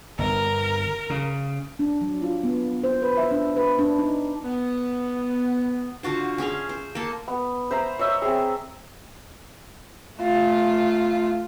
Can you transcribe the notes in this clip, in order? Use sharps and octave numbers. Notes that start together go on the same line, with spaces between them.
G1 A#4
C#3
D4
F#3
F4
B3
C5
B4
E5
D4
B4
D4
D#4
B3
D3 F4 F#4 C5
C#4 G#4 E5 F5
C5
A#3 A4
B3
C5 E5 A#5 B5
C#5 D#5 E5
C4 G#4
A3 F4